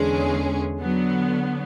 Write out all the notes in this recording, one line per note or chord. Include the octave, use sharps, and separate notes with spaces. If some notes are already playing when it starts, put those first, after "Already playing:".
Already playing: E2 D3 G#3 C#4 G#4
D3 F#3 B3